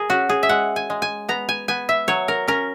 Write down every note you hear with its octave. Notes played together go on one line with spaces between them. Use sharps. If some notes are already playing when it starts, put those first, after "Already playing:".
Already playing: G#4 A#4
C#4 F#4
G#4
E5
G#3 F#5
G#5
G#3
G#5
B3 A#5
G#5
B3 G#5
E5
F#3 C#5
A#4
C#4 A#4